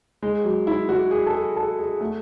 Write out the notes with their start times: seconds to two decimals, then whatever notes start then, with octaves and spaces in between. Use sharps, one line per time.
0.23 G#3
0.44 F#3
0.67 E4
0.89 F#4
1.11 G#4
1.27 A4
1.33 G#4
1.56 A4
1.78 G#4
2.01 A3